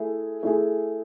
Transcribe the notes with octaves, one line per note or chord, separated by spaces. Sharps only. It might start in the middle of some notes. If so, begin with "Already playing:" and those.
Already playing: A3 E4 G#4
A3 E4 G#4